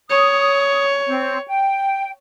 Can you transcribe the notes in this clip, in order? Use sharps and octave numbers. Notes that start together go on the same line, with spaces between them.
C#5 D#6
C4
G5